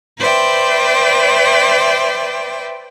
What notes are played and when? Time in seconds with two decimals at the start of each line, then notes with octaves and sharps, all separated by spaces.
0.19 B4 C5 D5 E5 G5